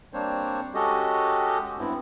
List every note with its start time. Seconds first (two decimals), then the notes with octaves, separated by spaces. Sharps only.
0.13 G3 A#3 C4 D4 C5 C#5
0.74 G#3 C#4 F#4 G4 A4 D#5
1.79 G2 B3 C4 E4